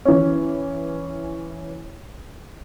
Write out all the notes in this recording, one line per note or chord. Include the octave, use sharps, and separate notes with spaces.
E3 C#4